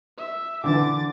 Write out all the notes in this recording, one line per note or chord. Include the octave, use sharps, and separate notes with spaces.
E5
D3 E3 D6 A6